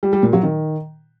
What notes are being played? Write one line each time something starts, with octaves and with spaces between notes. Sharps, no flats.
G3
G3
A#2
F#3
D#3